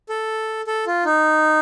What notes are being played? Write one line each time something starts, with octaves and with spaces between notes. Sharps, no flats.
A4
A4
F4
D#4